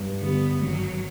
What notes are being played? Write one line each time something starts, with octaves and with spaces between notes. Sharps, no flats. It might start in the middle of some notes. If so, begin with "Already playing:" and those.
Already playing: G2
D3 G3 B3
G#1 F#3